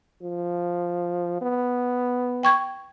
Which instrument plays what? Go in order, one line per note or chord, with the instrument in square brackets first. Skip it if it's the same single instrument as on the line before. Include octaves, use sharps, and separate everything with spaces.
[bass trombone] F3
B3
[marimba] G5 C#6 G#6